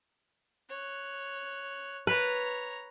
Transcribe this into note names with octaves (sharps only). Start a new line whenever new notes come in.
C#5 F#6
B4 C#5 A#5